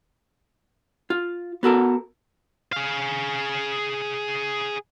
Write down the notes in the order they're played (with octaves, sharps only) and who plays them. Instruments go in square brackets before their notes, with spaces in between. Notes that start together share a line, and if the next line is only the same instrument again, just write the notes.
[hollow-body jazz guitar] F4
B3 F#4 A4 A#4
[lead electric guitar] G#4 F5